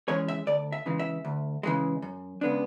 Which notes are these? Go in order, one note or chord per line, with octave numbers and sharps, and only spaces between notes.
E3 G#3 C#4 C#5
E5
D2 D5
E5
C#3 E3 G#3
E5
D2
C#3 E3 G#3
F#2
C#3 G#3 B3 D4